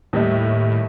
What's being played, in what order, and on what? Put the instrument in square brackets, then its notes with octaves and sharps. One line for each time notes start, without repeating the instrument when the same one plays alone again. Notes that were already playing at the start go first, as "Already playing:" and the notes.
[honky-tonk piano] D#2 G3 E5 [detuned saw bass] A2